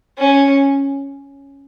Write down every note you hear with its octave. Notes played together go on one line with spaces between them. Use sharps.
C#4